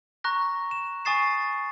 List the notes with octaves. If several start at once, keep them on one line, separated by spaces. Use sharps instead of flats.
A#5 C#6 F#6 A#6
E7
G#5 C#6 D#6 A6 C7 E7